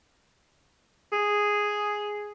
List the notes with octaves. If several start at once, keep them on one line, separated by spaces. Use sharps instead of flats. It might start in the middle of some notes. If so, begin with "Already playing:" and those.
G#4